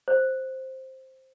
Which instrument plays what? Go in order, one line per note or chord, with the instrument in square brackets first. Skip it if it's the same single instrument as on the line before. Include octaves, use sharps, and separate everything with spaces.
[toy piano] C5